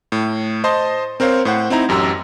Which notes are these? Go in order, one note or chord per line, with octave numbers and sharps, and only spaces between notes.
A2
C5 D#5 A5 C6
C4 A#4 C5 C#5 F5
A2 C5 F#5
C4 D#4 E4 A#5
A1 F#2 G4 A#5 E6